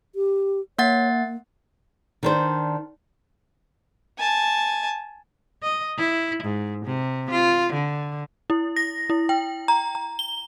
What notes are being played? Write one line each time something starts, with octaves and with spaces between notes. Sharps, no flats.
G4
A#3 C#5 F#5 A6
A#3
D#3 D4 C5
G#5 A5
D#5
E4
G#2
C3
F4
D3
E4
A#6
E4
G5
A#5
A#5
G7